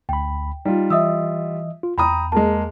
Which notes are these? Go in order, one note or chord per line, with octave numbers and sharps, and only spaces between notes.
D2 G5 B5
G3 D#4 F4
E3 D#5 E5 D#6 E6
F4
E2 G5 A#5 B5 D#6
G#3 A#3 G#4 A5